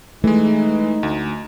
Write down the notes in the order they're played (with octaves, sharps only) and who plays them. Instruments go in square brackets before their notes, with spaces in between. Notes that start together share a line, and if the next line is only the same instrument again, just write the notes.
[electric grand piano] E3 G#3 [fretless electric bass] A3 [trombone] D#4
[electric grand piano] D2